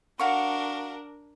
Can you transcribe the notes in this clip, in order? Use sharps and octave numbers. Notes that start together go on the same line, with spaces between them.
D4 F#4 A#4 F5 C#6